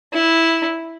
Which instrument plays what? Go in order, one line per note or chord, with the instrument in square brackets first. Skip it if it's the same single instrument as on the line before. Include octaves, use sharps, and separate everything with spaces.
[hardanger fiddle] E4